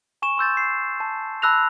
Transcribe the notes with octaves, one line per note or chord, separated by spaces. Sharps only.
G#5 C#6 E7
C6 E6 G6 A6
C7
A5
A5 B5 E6 F#6 A#6 F7